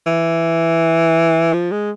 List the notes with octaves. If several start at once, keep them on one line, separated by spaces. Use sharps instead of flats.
E3
F3
G#3